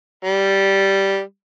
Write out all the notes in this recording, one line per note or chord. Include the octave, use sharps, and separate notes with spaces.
G3